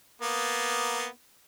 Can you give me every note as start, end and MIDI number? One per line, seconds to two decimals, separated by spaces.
0.22 1.06 58
0.22 1.06 59